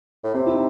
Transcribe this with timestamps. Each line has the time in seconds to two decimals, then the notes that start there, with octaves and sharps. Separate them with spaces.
0.24 A2
0.34 C3 C4
0.46 E4
0.54 D#4